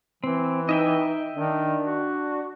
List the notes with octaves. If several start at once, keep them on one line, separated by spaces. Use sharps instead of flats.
E3 C4
D#4 D#5 E5 G5
D#3 D4
F#4